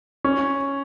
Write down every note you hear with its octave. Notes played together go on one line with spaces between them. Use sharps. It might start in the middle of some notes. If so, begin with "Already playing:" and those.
C#4